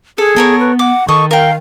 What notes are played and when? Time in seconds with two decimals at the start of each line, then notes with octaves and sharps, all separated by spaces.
0.18 G#4 A4
0.36 B3 A4 A#4 C#5
0.60 B4
0.79 F#5 D6
1.08 D#3 A4 D#5 C#6
1.31 A#4 F5 G5